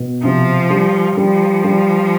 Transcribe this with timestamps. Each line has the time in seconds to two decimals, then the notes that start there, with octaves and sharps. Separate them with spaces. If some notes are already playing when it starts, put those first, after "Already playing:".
Already playing: B2
0.23 C3 F3
0.70 G3
1.17 F3 G3
1.64 G3